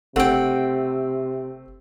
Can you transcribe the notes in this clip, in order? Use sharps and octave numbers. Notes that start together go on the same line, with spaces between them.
F#1 C3 A3 C4 F#5 G5